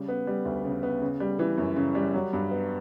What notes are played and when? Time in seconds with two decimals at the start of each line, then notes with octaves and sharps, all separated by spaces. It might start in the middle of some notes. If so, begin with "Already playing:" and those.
Already playing: C#3 G3
0.08 B3
0.27 G3
0.45 D2
0.65 C#3
0.83 B3
1.01 C#3
1.20 G3
1.39 E3
1.58 F#2
1.76 C#3
1.95 G3
2.14 F#3
2.33 G2
2.51 B3